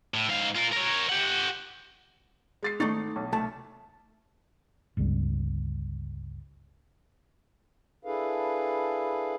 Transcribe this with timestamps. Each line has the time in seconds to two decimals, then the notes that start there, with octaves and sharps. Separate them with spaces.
0.14 A2
0.28 G#2 F5
0.55 F4 A#4
0.72 A#4 C#5
1.09 G4 F#5
2.63 G#3 A6 C7
2.80 G#1 A3 D#4 C#6 A6
3.16 B1
3.32 C2 A3 A5
4.97 G1 C#2 C#3 G3
8.05 D4 E4 G#4 A4 B4 F5